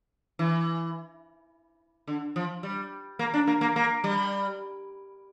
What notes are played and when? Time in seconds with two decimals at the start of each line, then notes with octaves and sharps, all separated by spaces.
0.39 E3
2.07 D3
2.36 F3
2.63 G3
3.19 A#3
3.34 D4
3.47 A#3
3.61 A#3
3.76 A#3
4.04 G3